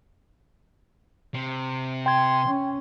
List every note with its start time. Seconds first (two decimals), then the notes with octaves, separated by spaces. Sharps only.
1.34 C3
2.06 G5 C6 G#6
2.46 C#4